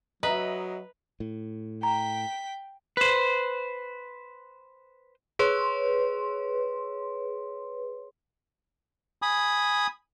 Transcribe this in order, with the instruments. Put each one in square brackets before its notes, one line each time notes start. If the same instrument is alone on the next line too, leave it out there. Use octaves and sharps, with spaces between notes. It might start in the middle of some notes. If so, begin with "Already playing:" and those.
[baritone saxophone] F#3 [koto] B4 [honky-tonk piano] D#5 E5 [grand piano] A#5
[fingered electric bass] A2
[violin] G5 B6 [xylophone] A#5
[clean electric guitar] B4 C5
[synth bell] G#4 B4 C#5 C6
[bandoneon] G#5 B5 D#6